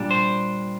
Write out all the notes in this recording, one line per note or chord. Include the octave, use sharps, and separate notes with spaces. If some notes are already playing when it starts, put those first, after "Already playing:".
Already playing: A#2 G3 D4
C5